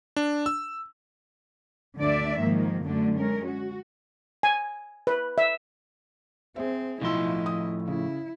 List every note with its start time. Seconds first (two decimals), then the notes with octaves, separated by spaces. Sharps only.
0.16 D4
0.46 E6
1.98 D2 D3 D4 D5 E5
2.39 G#2 D#3 F3 A#3
2.84 F#2 D3 F#3 A3 D4
3.15 G#3 C#4 A#4
3.46 F#4
4.43 G#5
5.07 B4
5.38 E5
6.56 C4 G#4 C5 E5
7.01 B1 A2 F3 E4 F4 D#5 C6 E6
7.46 D#6
7.88 C#3 E4